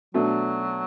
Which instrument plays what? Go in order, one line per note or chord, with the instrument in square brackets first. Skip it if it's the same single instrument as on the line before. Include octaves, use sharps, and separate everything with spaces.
[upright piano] B2 A3 D4 [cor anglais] F#3